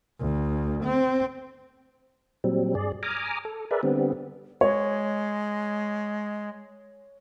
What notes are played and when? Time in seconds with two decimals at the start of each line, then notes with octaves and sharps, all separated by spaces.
0.19 D2
0.84 C4
2.44 A#2 F#3 G3 C4
2.75 G2 G#4 D5
3.03 G#5 A#5 D6 D#6 F6
3.45 A4
3.71 G#4 A#4 B4 D5 E5
3.83 D3 G3 B3 C4
4.61 G#3 C#5